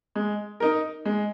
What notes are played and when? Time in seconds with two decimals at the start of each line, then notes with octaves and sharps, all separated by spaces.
0.15 G#3
0.60 D#4 A#4
1.05 G#3